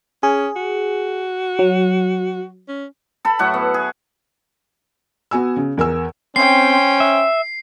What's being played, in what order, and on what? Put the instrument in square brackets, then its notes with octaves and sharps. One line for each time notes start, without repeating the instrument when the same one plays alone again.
[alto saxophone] C#4 [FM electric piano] G#4
[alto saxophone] F#4
[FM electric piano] F#3
[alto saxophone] C#4
[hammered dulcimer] A4 A5 B5
A2 F#3 E4 F#5
B3
G#4
[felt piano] B3 F#4 G#5 E6
C#3
E2 A#4 G#5 E6
[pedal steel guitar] C4 [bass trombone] C#4 [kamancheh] C5 G5 [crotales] C7
[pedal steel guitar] E5